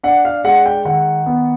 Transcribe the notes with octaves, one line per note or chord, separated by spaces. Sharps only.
D4 F#5
F5
G#3 F#5
G5
D#3 F#5
B3